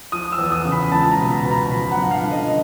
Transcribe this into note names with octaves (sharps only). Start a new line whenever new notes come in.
F3 D#6
E6
E2
D#6
C#3
B5
C#2 A5
A#5
B2
B5
B2
A#5
F3 B5
F#5
G2
F5
D3
D#5